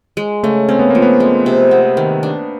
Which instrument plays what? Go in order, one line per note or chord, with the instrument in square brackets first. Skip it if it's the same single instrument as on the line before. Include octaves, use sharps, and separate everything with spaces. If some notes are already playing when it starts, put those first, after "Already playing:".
[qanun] G#3
[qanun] C#3 [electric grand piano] A3
[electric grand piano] C4 [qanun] C#4
[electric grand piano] B3
[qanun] F3 [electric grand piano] A#3
[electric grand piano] B3
[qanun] G#3
C3
B3
D#3
D4